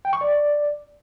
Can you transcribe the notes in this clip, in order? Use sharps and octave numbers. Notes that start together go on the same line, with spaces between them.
G5
C#6
D5